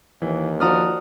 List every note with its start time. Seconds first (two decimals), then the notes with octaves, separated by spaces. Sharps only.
0.22 D#2 E3
0.60 F3 D4 F#4 A#5 D#6 F6